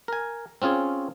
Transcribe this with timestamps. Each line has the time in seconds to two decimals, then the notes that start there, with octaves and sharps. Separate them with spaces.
0.08 A#4 G#5
0.62 C4 C#4 F4 G#4 C#5